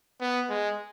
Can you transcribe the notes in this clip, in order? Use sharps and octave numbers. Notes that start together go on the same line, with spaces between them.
B3
G#3